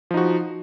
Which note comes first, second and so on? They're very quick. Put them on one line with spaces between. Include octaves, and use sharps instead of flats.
F3 D#4 F#4